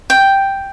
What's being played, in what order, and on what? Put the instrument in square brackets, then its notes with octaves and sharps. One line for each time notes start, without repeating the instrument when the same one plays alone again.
[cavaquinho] G5